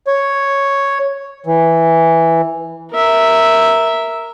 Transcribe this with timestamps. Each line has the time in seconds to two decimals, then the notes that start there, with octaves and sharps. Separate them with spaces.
0.07 C#5
1.46 E3
2.92 A#4 E5